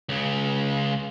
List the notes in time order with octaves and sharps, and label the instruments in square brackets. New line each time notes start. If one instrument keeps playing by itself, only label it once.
[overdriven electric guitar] C#2 C#3